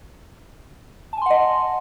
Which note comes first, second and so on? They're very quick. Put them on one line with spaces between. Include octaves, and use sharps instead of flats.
A5 G#5 C6 F#5 D#5